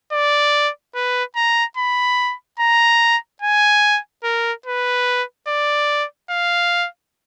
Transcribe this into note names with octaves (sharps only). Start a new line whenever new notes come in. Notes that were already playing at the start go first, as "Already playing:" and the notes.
D5
B4
A#5
B5
A#5
G#5
A#4
B4
D5
F5